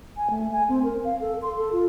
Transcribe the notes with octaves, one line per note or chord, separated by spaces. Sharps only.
G#5
A3
G#5
C4
A#4
F5
A4
C6
A4
F4